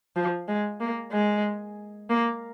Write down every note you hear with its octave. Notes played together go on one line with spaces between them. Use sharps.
F3
G#3
A#3
G#3
A#3